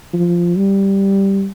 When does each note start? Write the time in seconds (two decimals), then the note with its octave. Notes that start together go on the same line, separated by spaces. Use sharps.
0.14 F3
0.57 G3